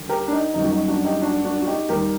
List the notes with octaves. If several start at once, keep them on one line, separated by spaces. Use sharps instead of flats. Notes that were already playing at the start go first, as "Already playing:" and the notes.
Already playing: D#2 D3 G3
G4 A#4
D4
D#4
F#1 F#2 D#3 G3 D#4
F#4
D#4
D4 F#4
D#4 G4
D4 F#4
D4 F#4
F#4
D#4 G4
D#2 D#3 G3 G4 A#4